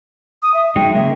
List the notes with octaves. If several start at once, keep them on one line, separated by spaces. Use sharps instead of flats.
D#6
E5
F#3 G#3 D#4 G5
C#3 G#3 A#3 E5